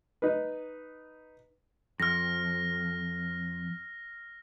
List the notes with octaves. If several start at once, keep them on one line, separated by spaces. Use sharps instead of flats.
D#4 B4
F2 F6 A#6